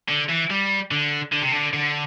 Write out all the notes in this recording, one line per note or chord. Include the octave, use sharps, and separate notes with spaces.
D3
E3
G3
D3
D3
C3
D3
D3